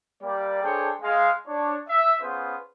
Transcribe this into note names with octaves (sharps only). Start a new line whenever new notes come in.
G3 A#3 D5
D4 G#4 A4 C5 C#5 G5
G#3 F5
D4 C#5
E5
B3 C#4 F4 G#4 B4 C5